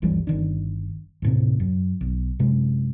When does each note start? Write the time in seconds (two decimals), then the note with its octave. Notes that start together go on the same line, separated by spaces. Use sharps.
0.02 G1 D2 E3 G3
0.27 G1 D#3 D4
1.22 D#2 A2 C3
1.60 F#2
2.01 B1
2.39 F#2 C3 G#3